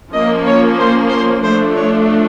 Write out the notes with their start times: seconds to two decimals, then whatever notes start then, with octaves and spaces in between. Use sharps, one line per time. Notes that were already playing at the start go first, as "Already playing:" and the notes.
0.12 F3 A#3 C#4 D#5
0.45 C#5
0.78 C5
1.10 C5
1.42 F3 A3 D4 C5
1.76 C#5